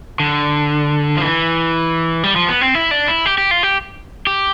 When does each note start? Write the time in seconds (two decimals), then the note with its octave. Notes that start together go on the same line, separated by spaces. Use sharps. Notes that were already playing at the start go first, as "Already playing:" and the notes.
0.20 D3
1.17 F3
1.22 E3
2.23 G3
2.36 F3
2.48 B3
2.61 C4
2.75 E4
2.91 D4
3.08 E4
3.26 G4
3.38 G4
3.51 F4
3.63 G4
4.27 G4